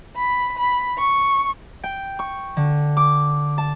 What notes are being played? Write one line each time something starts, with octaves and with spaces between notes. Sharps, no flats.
B5
B5
C#6
G5
C#6
D3
D6
A5